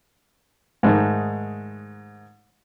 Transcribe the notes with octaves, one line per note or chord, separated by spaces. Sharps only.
G#2 D#3 G#3 A3 D#4